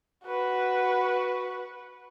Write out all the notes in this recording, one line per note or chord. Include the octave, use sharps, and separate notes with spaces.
F#4 B4